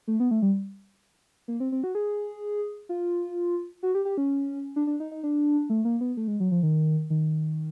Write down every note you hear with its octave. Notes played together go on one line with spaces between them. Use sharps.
A3
B3
A3
G3
A#3
C4
C4
F#4
G#4
F4
F#4
G4
G4
C#4
D4
D4
D#4
D#4
D4
A3
A#3
B3
A3
G#3
F#3
F3
D#3
D#3